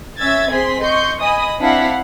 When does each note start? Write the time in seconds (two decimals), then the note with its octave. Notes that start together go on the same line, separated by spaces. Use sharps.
0.18 C#4 E5 E6 G#6 A6
0.50 C4 G#4 C6 B6
0.82 D#5 C6 C#6 G6
1.21 D#5 G#5 B5 D#6
1.62 C4 D4 E4 F5 F#5 B6